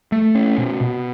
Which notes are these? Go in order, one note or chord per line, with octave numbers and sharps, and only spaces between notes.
A3
C#4
B2
B2